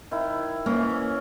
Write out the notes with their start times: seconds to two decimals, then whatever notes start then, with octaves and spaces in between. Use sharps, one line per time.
0.11 D#3 E4
0.66 E3 A#3 C#4